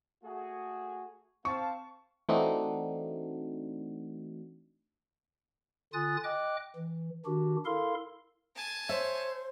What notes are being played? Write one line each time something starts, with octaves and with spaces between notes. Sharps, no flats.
A3 F#4 G#4
C4 F5 A5 C#6
E3 A3 C4 D4 D#4 F#4
D3 F4 G#5 D#6 F#6 A6
D#5 G5 D6 F#6
E3
D#3 D4 F#4 G4
E4 A4 A#4 F5 C6
G#5 A5
C5 C#5 E5